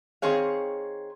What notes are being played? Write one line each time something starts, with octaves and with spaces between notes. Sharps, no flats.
D#3 C4 G#4 C#5 F5